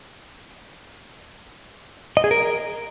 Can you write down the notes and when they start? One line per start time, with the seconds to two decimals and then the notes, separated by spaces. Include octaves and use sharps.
2.17 D#5
2.24 G#4
2.31 A#4